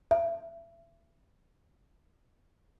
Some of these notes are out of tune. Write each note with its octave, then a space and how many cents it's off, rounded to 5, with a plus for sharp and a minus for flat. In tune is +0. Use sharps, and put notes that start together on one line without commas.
E5 +30